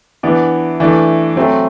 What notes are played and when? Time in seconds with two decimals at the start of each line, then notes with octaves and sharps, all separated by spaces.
0.23 E3 B3 D4
0.80 E3 A3 D4
1.36 F#3 A3 C4